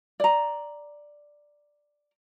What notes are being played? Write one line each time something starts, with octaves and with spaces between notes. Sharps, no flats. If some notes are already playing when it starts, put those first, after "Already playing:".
D5 A#5